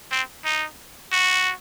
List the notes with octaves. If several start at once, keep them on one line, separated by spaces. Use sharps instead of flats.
C4
D#4
F#4